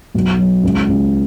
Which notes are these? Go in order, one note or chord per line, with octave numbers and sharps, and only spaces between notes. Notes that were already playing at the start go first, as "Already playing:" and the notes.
B1
F#3
C#2
C#2